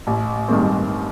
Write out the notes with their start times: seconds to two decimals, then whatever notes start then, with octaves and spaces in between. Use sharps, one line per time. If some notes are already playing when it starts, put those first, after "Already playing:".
0.07 A1
0.48 G2 D#3 G#3 C4